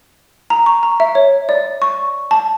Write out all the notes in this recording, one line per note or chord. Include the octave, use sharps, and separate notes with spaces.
A#5
C#6
A#5
E5
C#5
D5
C#6
A5